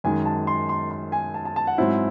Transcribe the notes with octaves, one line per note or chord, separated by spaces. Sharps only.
F#2 D#3 G#3 G#5
A5
C6
C6
C6
G#5
A5
A5
A5
F#5
G#2 F#3 C4 E4